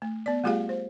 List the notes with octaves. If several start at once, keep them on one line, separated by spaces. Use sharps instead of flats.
A3
B3 D5
G3 A3 F4 G4 G#4 F5
C5